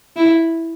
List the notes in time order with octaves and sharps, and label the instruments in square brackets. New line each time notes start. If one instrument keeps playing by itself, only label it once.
[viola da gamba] E4